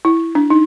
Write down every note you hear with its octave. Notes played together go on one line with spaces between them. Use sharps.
E4
D4
D#4